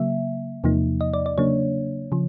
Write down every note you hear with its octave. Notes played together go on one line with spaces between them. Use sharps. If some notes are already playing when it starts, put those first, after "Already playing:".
Already playing: C#3 F#3 A#3 E5
E2 C3 F3 A#3 D#4
D#5
D5
D5
C#3 F#3 A#3 D4 C#5
C#3 F3